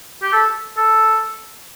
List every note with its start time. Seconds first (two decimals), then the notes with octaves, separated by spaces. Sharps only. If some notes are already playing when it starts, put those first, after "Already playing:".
0.22 G4
0.32 A4
0.77 A4